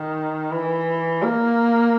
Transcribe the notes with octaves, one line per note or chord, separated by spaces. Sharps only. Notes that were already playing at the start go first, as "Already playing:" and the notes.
Already playing: D#3
E3
A#3